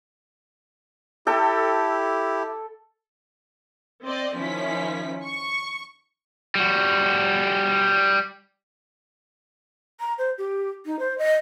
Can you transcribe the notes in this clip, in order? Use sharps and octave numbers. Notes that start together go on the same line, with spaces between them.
E4 G4 A4 G5
C4 D5 D#5
D#3 F3 C#4 E4 B6
C#6
G3 F#4
A#5
C5
G4
D#4
C5
D#5